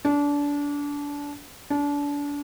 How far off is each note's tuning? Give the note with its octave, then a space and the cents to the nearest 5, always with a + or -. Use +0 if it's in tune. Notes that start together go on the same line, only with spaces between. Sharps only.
D4 -25
D4 -30